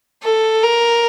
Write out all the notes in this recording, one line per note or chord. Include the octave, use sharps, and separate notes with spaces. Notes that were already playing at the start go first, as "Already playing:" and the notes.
A4
A#4